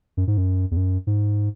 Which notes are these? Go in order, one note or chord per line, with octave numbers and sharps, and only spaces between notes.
F#2
G#2
F#2
E2
F#2
G#2